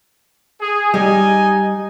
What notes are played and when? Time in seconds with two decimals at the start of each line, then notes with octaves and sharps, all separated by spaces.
0.60 G#4
0.94 G3 D#4 D#5 G#5